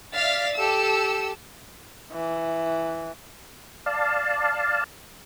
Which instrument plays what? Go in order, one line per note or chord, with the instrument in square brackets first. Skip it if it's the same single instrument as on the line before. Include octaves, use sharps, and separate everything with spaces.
[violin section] D5 E5 F5 F6 A6 B6
G4 A4 E6
[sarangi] E3
[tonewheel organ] D5 F5 A5